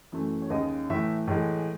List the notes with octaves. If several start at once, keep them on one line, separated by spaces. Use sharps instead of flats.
F#2 E3 A3
C#5
D#2 C#3 G#3 D#5
A2 E3 A3 E5
A2 E3 G#3